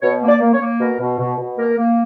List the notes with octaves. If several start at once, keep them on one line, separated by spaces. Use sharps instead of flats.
B2 C#5
A#3
D5
A#3
C#5
A#3
B2 A#4
B2
B2
B2
A#3 A#4
A#3